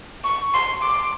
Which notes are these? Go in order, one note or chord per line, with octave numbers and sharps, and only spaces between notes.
C#6
C6
D6